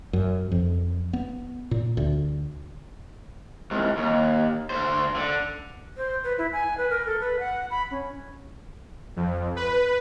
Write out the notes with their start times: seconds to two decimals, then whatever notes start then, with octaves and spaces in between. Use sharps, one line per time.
0.13 F#2
0.52 F2
1.13 B3
1.71 A#2
1.97 D2
3.71 C2 G#2
3.97 D#2
4.70 D2 C5
5.16 D3
5.97 C5
6.24 B4
6.38 E4
6.52 G#5
6.77 B4
6.90 A#4
7.07 A4
7.20 B4
7.39 F#5
7.70 B5
7.91 C#4
9.16 F2
9.56 B4